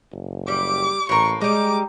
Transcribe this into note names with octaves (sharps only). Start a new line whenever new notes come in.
F#1
G3 D6
A1 A2 A#3 C#6
G3 G#3 D#4 D6